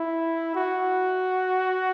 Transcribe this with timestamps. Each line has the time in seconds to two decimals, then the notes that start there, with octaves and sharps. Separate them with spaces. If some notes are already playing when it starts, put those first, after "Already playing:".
Already playing: E4
0.56 F#4